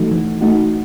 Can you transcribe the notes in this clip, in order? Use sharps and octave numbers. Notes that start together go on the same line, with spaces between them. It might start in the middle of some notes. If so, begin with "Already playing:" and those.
Already playing: E3 A3 D#4 F#4
E3
A3 D#4 F#4